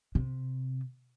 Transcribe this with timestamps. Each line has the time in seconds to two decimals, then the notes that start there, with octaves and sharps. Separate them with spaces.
0.15 C3